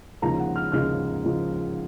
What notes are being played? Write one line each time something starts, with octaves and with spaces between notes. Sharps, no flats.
D#2 C#3 F3 G#3 A#5
F#5
F6
D#2 C#3 F3 G#3 F6
C#3 F3 G#3